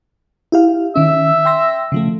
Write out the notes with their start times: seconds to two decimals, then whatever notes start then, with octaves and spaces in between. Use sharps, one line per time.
0.52 E4 G4 F5
0.96 D#3 C#4 E5
1.45 G5 C6 A#6
1.92 C#3 F3 A3